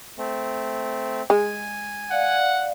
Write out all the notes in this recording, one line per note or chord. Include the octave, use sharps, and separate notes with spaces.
A3 C4
G#3 G#5
D5 F5 F#5